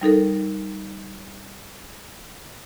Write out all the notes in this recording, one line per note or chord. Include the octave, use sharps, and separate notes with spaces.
G3 D#4 A4 A#4